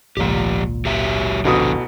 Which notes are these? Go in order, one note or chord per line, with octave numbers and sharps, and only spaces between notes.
G#1 C#2 A#2 F3 G4
F#3 G4 E5
A1 F2 B2 D3 D#6